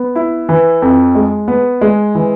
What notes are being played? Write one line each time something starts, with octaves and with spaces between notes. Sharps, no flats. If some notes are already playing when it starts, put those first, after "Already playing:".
Already playing: B3
E4
E3
F2
G#3
B3
G#3
E3